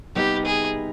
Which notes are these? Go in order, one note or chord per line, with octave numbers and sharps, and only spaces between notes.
C3 G3 B3 D#4 G4
G#4